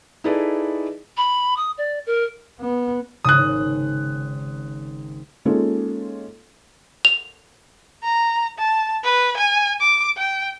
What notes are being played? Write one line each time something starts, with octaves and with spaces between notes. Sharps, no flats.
D#4 E4 G#4 A4 B4 D5
B5
D#6
D5
A#4
B3
G#1 C#3 D#6 F#6
G#3 A#3 C#4 D#4 F4 A4
F7
A#5
A5
B4
G#5
D6
G5